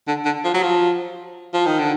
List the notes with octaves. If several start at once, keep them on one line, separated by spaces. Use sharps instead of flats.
D3
D3
F3
F#3
F3
F3
D#3
D3